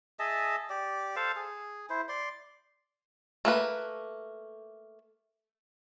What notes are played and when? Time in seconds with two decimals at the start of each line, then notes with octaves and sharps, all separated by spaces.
0.19 G#4 D#5 E5 A5
0.70 G4 D5
1.16 A4 C5 F5 A5
1.36 G#4
1.90 E4 C5
2.09 D5 C6
3.45 A3 A#3 B4